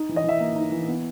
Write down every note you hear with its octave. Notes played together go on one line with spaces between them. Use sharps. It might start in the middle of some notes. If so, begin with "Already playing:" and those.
Already playing: D#4
E3
D#5
E3 E5
A#3
D#4
E3
B3